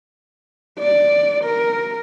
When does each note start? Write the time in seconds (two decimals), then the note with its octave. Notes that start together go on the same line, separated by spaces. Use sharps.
0.79 D5
1.45 A#4